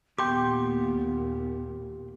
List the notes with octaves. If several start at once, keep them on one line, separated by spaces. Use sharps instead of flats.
D#2 A#2 B3 G4 G5 C6 D6 G6